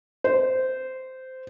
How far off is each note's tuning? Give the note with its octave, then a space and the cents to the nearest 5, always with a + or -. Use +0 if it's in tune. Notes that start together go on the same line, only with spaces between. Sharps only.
C5 -15